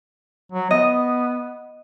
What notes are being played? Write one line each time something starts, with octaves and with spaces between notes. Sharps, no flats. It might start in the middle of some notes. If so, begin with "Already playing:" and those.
F#3
B3 D#5